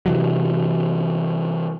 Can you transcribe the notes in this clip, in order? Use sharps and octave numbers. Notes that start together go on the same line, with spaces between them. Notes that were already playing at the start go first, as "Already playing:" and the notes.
C3 E3 F#3